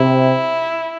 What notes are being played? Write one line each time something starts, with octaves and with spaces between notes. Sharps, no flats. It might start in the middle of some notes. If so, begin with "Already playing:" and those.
Already playing: C3 E4